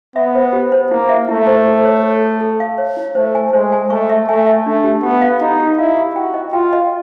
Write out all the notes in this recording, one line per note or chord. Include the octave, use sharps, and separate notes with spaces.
B3 E5
C5
G4
C5
A#3 E4
E5
A3 E4
C5
A4
C#5
A4
A4
A4
F5
C#5
E4
A3 C5
G#5
G#3 C5
G#5
A3 C#6
E5
A3 G#5
E5
A3 D4
G4
B3 G4
F5
D#4 G4
G4
E4 F5
G4
F#4 G5
D#5
F4 G5
D#5